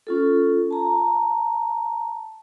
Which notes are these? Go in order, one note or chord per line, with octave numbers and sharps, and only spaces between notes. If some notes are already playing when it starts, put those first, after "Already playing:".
C#4 F4 A4
A5 A#5